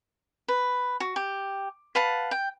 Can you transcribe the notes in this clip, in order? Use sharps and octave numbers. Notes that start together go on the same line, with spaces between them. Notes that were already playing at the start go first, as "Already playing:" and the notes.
B4
F#4
G4
B4 F5 F#5 A5
G5